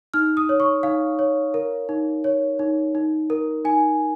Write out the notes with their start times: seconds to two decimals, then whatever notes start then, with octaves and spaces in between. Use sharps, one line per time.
0.14 D#4 F6
0.37 D#6
0.49 C#5
0.60 C#6
0.83 D#4 F5
1.19 C#5
1.54 A#4
1.89 D#4
2.24 C#5
2.59 D#4
2.95 D#4
3.30 A#4
3.65 D#4 G#5